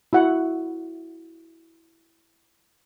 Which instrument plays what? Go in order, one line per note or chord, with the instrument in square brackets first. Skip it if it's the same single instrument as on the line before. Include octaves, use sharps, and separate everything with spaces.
[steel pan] E4 F#4 F#5